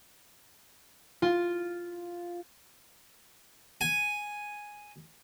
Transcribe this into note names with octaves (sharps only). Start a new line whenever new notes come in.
F4
G#5